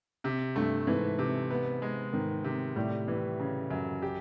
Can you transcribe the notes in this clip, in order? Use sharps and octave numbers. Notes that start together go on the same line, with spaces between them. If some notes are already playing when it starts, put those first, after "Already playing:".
C3
G2 A3
G#2 E3
C3
B3
G#3
G#2 D#3
C3
A2 G3
E3
C#3
F#2
G4